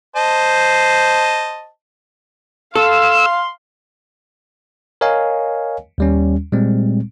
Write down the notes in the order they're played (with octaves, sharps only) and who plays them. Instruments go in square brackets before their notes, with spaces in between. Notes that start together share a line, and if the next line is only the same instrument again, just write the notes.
[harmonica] C5 D#5 A5
[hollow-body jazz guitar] A4 [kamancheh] F5 [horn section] C6 [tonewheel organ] E6
[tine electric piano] A#4 C#5 D#5 F5 G#5
D#2 G3 C#4
A#2 G3 G#3 C4